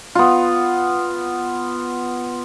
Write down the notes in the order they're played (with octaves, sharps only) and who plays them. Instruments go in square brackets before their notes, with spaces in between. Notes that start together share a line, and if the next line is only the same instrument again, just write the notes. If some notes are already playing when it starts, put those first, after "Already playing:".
[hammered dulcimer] B3 F4